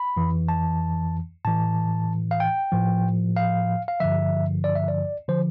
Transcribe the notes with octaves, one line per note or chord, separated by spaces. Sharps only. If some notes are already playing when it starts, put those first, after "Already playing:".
Already playing: B5
F2 E3
A5
A2 E3 A5
F5
G5
A2 F3
F5
F5
G2 D3 F3 E5
D5
E5
D5
D3 F3 C5